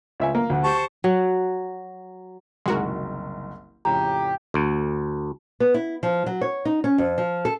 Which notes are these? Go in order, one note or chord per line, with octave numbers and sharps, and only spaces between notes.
C#2 E5 G#5
A#3
D2 D3
G4 C5 A5 C#6
F#3
F#1 C2 D#3 G#3 F#4 A#4
F2 A2 C#3 G4 A#5
D2
B3
E4
F3
F#3
C#5
D#4
C#4
F2
F3
A4